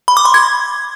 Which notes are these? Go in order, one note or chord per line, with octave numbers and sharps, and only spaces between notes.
B5
D6
C6
G#6